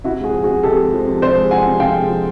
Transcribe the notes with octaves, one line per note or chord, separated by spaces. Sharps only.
C3 E4 F#4
G#3 F#4 G#4
F3
F#4 G#4
C3
C3 G4 A4
G#3
F3
C3
C3 C5 D5
G#3
F3 F#5 G#5
C3
C3 F5 G5
G#3
F3